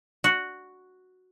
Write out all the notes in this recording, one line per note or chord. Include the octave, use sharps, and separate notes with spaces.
F#4